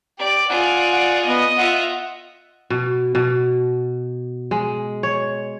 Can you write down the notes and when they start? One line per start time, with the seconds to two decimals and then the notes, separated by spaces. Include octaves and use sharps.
0.19 G4 D5
0.49 F4 G#4 D5 F#5
0.92 F#5
1.26 B3 D#5
1.58 F4 E5 F#5
2.70 B2
3.15 B2
4.51 G#3
5.03 C#5